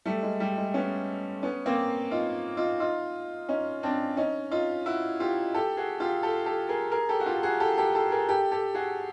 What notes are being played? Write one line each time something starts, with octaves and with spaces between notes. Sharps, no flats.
G3 A3
G#3
G3
G#3
B3 C#4
B3 C#4
A#3 C4
D#4 F4
D#4 F4
D#4 F4
C#4 D#4
C4 D4
C#4 D#4
D#4 F4
E4 F#4
F4 G4
G4 A4
F#4 G#4
F4 G4
G4 A4
G4 A4
G#4 A#4
G#4 A#4
G4 A4
F#4
F4 G4
F#4 G#4
G4 A4
G4 A4
G4 A4
G#4 A#4
G4 A4
G4 A4
F#4 G#4